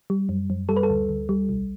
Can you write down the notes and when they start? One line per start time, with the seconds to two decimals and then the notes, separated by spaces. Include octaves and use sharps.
0.10 G3
0.29 F#2
0.50 F#2
0.69 G3 A4
0.76 B4
0.83 A4
0.90 D2
1.09 D2
1.29 G3
1.49 B1